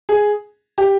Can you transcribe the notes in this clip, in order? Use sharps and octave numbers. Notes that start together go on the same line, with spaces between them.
G#4
G4